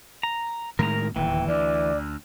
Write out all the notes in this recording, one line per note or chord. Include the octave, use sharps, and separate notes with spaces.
A#5
A2 D#3 G#3 A#4 A#5
D1 D#2 E3 G5
D2 D5